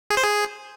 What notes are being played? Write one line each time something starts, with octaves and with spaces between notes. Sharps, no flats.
G#4
C5
G#4